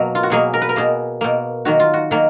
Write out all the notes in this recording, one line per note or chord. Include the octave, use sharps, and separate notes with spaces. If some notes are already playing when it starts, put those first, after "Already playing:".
Already playing: B2 F#3 A#3
F4
F#4
B2 F#3 A#3 G#4
A#4
B4
A#4
B2 A#3 G#4
B2 A#3
D#3 F#3 A#3 F#4
F4
F#4
D#3 F#3 A#3